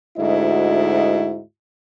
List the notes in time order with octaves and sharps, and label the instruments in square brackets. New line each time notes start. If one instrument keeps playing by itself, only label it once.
[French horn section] D2 G#2 E4 F#4 D#5